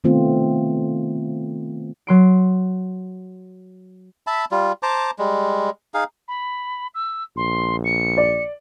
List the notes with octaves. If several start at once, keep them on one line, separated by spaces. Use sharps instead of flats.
D#3 A3 B3 C4 F4
F#3 C6 D7
E5 A5 B5
G3 F4
C5 A5 A#5 D6
G3 G#3
D#4 G#4 F5
B5
E6
A#1 C6
C#7
D5